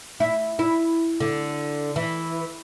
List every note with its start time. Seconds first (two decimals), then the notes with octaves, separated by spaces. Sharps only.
0.20 E4
0.59 E4
1.20 D3
1.96 E3